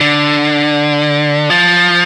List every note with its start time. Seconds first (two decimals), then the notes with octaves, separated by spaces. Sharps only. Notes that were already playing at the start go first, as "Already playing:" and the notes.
0.01 D3
1.50 F3